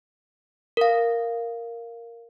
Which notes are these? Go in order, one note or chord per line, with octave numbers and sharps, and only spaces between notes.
A#4 F5